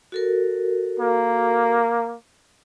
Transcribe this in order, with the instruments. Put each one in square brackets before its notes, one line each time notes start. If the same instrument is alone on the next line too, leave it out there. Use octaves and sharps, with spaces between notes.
[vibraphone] F#4 A4 A#4
[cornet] A#3